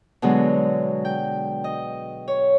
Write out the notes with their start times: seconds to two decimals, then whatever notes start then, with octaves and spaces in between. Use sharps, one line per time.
0.22 B2 D3 F#3 G#3
1.05 G5
1.64 D#5
2.28 C#5